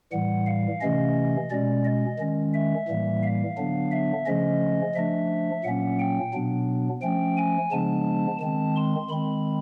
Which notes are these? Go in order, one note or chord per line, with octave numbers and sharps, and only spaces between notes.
A2 E3 G3 F#5
F5
C3 E3 A3 C#4 D#5
B2 G#3 C#4 D5
D#5
D#3 G#3 C#4
E5
A2 E3 G3 A#3
F5
D3 F#3 B3 D4
E5
C#3 F3 A3 C#4 D#5
F3 A3 D4 E5
A#2 F#3 A#3 C#4 F#5
G5
B2 F#3 B3 D4
F3 A3 C#4 G5
G#5
C#3 F3 G#3 B3 D4 A5
D#3 G#3 C4 A5
C6
D#3 G#3 C4 B5